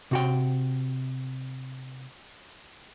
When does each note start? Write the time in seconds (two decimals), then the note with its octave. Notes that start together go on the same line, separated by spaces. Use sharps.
0.11 C3 F#4 G5